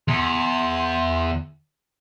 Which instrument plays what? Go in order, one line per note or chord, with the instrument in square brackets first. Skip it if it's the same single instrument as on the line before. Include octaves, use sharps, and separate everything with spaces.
[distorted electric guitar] E2 [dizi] C6